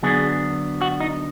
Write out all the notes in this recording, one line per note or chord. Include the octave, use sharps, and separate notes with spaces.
D3 F#3 B3 D4 G#4
F#4
D#4